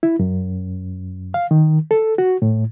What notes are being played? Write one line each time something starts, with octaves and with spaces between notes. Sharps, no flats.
E4
F#2
F5
D#3
A4
F#4
A2